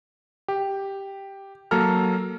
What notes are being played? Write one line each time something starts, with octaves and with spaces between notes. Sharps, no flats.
G4
F#3 A#3 A4 A#5 F6